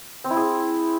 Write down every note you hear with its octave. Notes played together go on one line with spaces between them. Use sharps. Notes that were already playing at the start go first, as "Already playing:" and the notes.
C4
E4
G#4